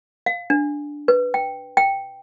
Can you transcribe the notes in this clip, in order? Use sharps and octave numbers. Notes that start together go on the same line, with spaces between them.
F5
D4
B4
G5
G5